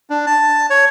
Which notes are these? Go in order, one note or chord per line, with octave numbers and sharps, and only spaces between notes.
D4
A5
C#5